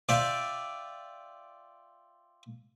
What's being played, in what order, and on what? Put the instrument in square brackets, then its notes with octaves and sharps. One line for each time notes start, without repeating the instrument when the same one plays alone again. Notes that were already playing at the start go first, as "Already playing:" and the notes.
[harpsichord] F4 D5 E5 G5